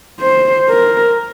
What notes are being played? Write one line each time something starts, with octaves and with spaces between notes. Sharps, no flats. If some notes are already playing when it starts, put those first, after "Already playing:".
C5
A#4